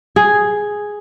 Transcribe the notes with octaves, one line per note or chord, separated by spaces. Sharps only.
G#4